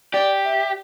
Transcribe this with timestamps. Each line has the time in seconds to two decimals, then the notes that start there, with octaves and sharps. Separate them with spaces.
0.13 G4 D5
0.45 E5